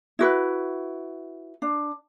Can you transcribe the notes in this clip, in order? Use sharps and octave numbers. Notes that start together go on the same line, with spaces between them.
E4 F#4 B4
D4